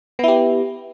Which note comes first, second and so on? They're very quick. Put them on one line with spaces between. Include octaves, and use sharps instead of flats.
B3 E4 G4